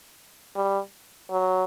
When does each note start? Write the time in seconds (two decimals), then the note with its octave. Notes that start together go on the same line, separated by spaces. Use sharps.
0.56 G3
1.31 F#3